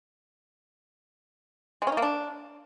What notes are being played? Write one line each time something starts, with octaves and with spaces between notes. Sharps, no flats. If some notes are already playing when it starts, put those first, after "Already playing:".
G#3
C#4
D#4
A#3
D4